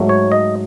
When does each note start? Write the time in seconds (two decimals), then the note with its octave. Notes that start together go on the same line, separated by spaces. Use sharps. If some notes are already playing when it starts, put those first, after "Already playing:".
Already playing: G#2 F#3 A3
0.09 C#5
0.32 D#5